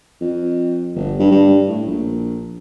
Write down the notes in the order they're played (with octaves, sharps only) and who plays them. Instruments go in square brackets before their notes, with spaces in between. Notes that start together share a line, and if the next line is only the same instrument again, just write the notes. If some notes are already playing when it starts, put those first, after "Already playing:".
[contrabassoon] F2
G1
G2
G2
A2
A#1